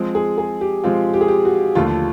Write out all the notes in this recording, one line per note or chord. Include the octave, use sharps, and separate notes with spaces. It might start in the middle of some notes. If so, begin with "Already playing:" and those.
Already playing: F3 G#3 C4
G#4
G#4
G4
F3 G#3 C4 F4
G4
G#4
G4
F#4
D#2 D3 F3 A3 F4